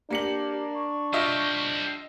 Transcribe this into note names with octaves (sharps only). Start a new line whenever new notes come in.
A#3 D4 G4 C#7 F#7
C#6
G3 C4 F4 D#5 E5